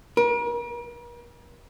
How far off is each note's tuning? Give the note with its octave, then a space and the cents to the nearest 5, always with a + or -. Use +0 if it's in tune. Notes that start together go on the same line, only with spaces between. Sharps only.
A#4 +45